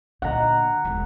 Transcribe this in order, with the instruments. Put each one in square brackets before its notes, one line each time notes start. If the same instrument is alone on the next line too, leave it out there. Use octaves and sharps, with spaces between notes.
[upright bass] A#2 D3 [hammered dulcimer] F#5 A#5
[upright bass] E1 G#3